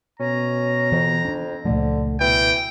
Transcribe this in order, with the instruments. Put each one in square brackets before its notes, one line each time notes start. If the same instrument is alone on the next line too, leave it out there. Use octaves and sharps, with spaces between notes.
[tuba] B2 [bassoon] C#4 [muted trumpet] A#5
[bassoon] F2 [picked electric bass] E3
[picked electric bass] C#4 D4
[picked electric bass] C#2 A#2 F3 [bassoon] D3 [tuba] A3
[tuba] B2 [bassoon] E3 [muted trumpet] G5